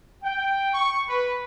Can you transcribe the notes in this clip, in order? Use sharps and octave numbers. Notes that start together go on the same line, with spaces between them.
G5
C#6
B4